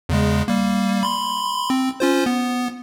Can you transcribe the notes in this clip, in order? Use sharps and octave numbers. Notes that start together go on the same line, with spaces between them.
E2 C#3 G#3
G3 A#3
B5 C6
C4
C#4 F4 C5
B3